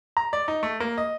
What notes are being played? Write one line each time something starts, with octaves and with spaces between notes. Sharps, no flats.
A#5
D5
D#4
A3
A#3
D#5